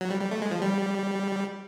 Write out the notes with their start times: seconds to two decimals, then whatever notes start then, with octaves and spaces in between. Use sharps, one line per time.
0.01 F#3
0.10 G3
0.21 G3
0.31 A3
0.42 G#3
0.51 F3
0.62 G3